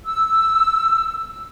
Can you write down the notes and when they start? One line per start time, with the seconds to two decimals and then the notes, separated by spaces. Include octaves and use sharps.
0.05 E6